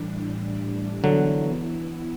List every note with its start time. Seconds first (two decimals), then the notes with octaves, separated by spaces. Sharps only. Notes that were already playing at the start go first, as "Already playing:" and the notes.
Already playing: A2 E3 G3 D4
1.04 D3 E3 F#3 B3 E4